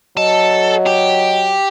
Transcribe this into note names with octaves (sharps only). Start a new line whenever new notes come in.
F#3 A4 D#5
G4